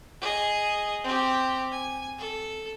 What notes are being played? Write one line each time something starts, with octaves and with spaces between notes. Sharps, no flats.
G#4 D#5
C4 G4
G#5
A4